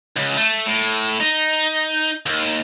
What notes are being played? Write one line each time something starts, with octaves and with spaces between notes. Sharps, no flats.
C#2
A3
A2
D#4
D#2